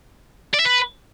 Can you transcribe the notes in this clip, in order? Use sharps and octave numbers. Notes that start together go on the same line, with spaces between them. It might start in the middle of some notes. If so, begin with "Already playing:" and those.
D5
E5
B4